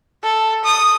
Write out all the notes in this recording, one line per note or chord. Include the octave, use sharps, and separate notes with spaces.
A4
D#6